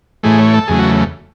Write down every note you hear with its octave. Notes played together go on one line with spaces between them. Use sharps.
A2 E3 A3 G#4
C#5
A4
E2 C#3 F#3 A3 G#4
F#4